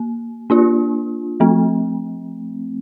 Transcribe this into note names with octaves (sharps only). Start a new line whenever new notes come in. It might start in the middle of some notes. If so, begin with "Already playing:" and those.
Already playing: A#3
A#3 D4 F4
F3 A3 C4